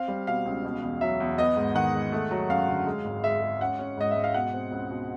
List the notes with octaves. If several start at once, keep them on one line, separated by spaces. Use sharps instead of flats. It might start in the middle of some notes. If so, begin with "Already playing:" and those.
Already playing: C4 F5
G3
B2 F5
C#2
B2
E2
F#3 E5
E2
B3 D#5
G#2
D#3 F#5
G#3
A3
F#3
F#2 F5
D3
G#3
G#1
G#3 E5
G#3
C#4 F#5
C#4
G#2 D#5
G#2 E5
F5
B2 F#5
C4
C#2
B2